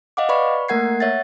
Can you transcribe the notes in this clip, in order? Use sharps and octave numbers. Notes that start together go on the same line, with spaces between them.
D#5 F5 F#5 D6
B4 D5 B5 C#6
A3 A#3 A#4 F#5 G#6 C7
C#5 E5 F#5 A6